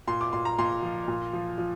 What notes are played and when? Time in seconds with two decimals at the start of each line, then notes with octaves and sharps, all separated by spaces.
0.07 A#2 C6
0.21 D6
0.33 A#2 C6
0.45 A#5
0.59 A#2 C6
0.83 F3
1.08 A#2
1.33 F3
1.58 F3